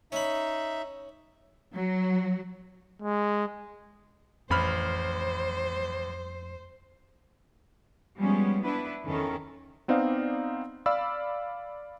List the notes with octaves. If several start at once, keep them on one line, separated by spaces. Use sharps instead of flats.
C#4 D#4 E5 B5
F#3
G#3
A1 F2 C5 B5 F6
F3 G3 G#3 B3 C#4
B3 D4 E4 B4
E2 D#3 E3 C#4 A4 A#4
B3 C4 D#4 D5 F5
D5 F5 B5 E6